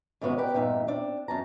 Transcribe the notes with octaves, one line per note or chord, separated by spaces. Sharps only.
G#2 C3 D#3 B3 C#4 F#4
G4 A#4 B4 D5 G5
E2 G2 A#2 D#4 E5
C4 D4
F#2 A5 A#5